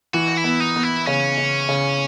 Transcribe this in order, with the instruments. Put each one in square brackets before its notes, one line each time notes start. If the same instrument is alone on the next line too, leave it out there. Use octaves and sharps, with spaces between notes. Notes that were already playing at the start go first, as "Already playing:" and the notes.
[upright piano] E3 [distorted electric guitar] F#4
[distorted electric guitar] E4
[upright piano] B3
[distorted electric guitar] D#4
[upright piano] B3
[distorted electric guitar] E4
[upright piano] C#3 [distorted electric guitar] C#4
[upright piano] C#3
C#3